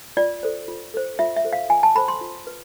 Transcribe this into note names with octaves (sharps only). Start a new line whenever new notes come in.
F4 D5
A4 C5
F4
A4 C5
F4 E5
E5
A4 C5
F5
F4 G#5
A5
A4 C5 B5
C6
F4
B4